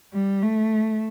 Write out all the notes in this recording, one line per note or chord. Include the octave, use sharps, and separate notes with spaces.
G3
A3